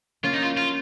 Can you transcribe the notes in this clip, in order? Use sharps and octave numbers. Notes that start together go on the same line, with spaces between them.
A#3 C#4 F4
D#4
F4
F4